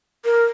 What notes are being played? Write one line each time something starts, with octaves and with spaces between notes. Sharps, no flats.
A#4